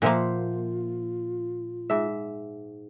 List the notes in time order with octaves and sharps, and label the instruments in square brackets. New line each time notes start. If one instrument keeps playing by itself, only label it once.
[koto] A#2 F3 A#3 [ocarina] F4 [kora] C5 E5 F#5
[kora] G#2 E5